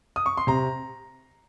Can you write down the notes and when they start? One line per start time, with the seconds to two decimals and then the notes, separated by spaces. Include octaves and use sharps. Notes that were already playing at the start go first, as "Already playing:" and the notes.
0.16 D#6
0.26 C#6
0.37 C6
0.47 C3 A#5